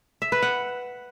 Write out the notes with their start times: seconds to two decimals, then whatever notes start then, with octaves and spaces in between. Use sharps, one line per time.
0.22 E5
0.32 B4
0.42 F#5